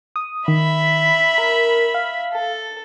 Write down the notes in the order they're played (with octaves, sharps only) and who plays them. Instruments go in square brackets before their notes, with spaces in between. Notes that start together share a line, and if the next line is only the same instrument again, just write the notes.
[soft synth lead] D#6
[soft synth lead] D#3 [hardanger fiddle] E5 B5
[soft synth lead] A#4
F5
[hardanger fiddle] A4